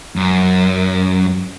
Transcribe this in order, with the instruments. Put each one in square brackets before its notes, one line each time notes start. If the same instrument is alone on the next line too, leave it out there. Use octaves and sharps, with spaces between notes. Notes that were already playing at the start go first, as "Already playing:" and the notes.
[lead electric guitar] F#2